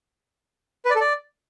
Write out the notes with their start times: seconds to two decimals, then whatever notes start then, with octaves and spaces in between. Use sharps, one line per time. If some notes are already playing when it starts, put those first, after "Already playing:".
0.85 B4
0.90 D5
0.95 A4
1.01 D5